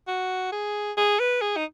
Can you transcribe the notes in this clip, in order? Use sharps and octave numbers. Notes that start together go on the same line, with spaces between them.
F#4
G#4
G#4
B4
G#4
D#4